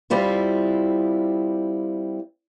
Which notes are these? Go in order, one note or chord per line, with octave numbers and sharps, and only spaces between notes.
G3 C4 E4 F4